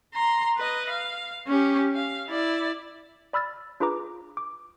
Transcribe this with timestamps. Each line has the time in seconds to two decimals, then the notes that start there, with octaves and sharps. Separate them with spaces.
0.14 A#5 C6
0.58 B4 D#5
0.89 F5
1.48 C#4 G4
1.95 F5
2.28 E4 D5
3.33 D5 B5 E6 F6 A6
3.80 D4 F4 G#4 B4 A#5 D6
4.37 D6